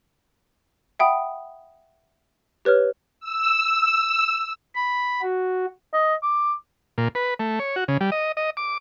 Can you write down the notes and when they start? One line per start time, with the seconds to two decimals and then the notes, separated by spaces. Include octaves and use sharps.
0.99 E5 F#5 G5 B5 D#6
2.65 G4 B4 C#5 F6
3.20 E6
4.75 B5
5.22 F#4
5.93 D#5
6.23 D6
6.98 A#2
7.15 B4
7.39 A3
7.59 C#5
7.76 F#4
7.88 C#3
8.01 G3
8.12 D#5
8.37 D#5
8.57 D6